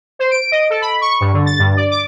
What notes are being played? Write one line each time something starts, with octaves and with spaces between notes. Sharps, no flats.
C5
D7
D#5
A4
B5
C#6
G2
D3
A6
G2
D5
D6